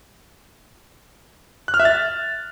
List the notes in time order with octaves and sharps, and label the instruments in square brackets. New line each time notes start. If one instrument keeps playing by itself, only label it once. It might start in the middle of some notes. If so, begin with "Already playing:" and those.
[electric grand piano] F#6
F6
E5
A6